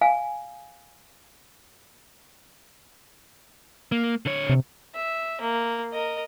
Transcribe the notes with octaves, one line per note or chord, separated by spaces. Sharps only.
F5 G#5
A#3
D3 C#5
C3
E5
A#3
A#4 D#5